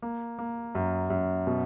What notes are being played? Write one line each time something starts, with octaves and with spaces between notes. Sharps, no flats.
A#3
A#3
F#2
F#2
B2